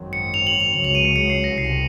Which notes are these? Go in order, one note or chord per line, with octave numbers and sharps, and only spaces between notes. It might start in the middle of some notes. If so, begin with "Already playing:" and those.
Already playing: G#1 F#2 D#3 F#3 C4
C#7
F7
F#7
F7
C#2 C#3 F#3 F7
F7
D#7
C#7
C#7
C7
A#6
C2 C7